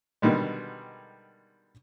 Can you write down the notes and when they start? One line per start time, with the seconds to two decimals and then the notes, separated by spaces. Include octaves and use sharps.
0.22 B2 D3 D#3 G3 G#3